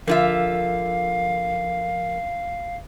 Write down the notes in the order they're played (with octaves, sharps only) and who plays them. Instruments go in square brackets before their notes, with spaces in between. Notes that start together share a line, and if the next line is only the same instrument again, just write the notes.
[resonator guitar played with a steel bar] D3 F4 E5 [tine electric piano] F3 A#4 [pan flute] F5